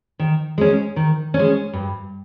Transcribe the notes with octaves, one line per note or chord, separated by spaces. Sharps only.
D#3
G#3 C#4
D#3
C#4
G#3
G2